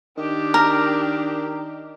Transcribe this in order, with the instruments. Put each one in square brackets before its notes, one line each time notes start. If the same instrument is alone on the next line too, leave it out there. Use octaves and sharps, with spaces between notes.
[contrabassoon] D#3 [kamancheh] D4 G4
[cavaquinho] A#4